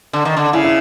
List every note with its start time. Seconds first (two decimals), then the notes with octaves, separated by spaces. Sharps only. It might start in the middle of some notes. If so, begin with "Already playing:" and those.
0.13 D3
0.25 D#3
0.37 D3
0.53 C#3 E4
0.64 E4